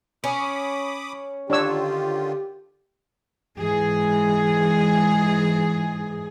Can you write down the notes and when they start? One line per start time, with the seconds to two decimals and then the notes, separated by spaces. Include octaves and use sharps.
0.24 C#4 B5 D6 D#6
1.50 D3 D#3 D4 F4 G4 C#5 E6
3.58 G#2 E3 G#4